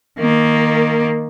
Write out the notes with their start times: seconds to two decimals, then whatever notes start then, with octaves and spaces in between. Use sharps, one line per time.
0.19 D#3 A#3